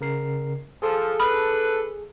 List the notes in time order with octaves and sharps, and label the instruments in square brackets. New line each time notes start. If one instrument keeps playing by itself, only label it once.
[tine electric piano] C#3 A#4 C7
[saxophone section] F3 [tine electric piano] G#4 [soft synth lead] A4
[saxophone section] D4 B4 [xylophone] B5 D#6 F6